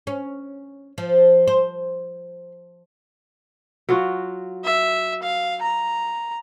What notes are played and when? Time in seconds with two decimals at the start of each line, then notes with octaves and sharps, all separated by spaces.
0.07 C#4
0.98 F3
1.47 C5
3.89 F#3 F4 F#4
4.64 E5
5.23 F5
5.62 A#5